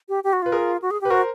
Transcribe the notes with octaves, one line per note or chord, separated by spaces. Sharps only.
G4
G4
F#4
F4 B4
G#4 A#4
F#4
G#4
G4
B4
F#4 A#4 C5